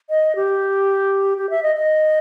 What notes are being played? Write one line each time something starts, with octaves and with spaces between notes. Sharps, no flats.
D#5
G4
G4
E5
D#5
D#5